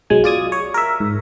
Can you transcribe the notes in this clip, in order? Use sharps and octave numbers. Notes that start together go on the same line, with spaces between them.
B1 F#3 G#3 G#5
F4 D5 D#6 G#6
C#5
A#4 E5
G#2